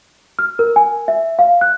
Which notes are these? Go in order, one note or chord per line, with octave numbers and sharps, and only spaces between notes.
F6
A#4
G#5
E5
F5
F#6